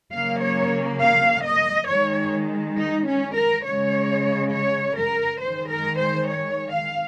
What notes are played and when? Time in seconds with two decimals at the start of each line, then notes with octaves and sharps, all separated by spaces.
0.12 C#3 F#3 A#3 F5
0.42 C#5
1.01 F5
1.44 D#5
1.88 D#3 G#3 C#5
2.77 D#4
3.06 C#4
3.35 A#4
3.64 C#3 G#3 C#5
4.51 C#5
4.97 A#4
5.40 D#3 G#3 C5
5.69 A#4
5.98 C5
6.28 C#5
6.71 F5